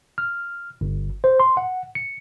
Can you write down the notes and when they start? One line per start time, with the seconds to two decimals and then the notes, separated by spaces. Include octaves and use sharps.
0.18 F6
0.81 G1
1.24 C5
1.40 C6
1.57 F#5
1.95 C#7